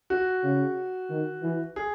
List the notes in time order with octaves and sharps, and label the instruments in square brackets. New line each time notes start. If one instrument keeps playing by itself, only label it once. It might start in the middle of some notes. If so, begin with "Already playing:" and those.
[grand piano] F#4
[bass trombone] C#3
D#3
E3
[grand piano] G#4